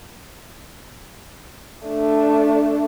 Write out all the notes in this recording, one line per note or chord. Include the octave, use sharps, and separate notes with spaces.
A3 D4